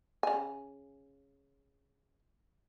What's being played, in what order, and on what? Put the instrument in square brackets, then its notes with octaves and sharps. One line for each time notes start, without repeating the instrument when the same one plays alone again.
[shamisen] C#3 G#5